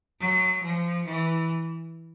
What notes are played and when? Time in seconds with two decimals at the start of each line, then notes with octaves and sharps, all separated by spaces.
0.20 F#3
0.63 F3
1.06 E3